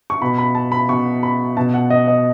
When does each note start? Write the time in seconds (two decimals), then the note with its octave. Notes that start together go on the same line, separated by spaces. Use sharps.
0.10 C#6
0.22 B2 B5
0.38 B5
0.55 A5
0.72 B5
0.89 B2 C#6
1.23 B5
1.57 B2 A5
1.74 F#5
1.90 D#5
2.08 D#5